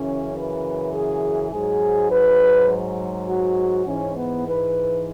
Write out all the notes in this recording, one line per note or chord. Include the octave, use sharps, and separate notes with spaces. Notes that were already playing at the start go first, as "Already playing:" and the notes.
Already playing: F#2 C#3 E3 C#4
B4
G#4
G#2 F#3 G#4
B4
F#4
G#2 E3 C#4
B3
B4